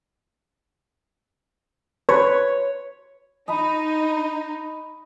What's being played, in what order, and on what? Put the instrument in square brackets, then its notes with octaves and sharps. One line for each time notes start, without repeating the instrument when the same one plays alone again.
[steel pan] B4 [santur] C#5
[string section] D#4 [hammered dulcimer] D#5 A#5 B5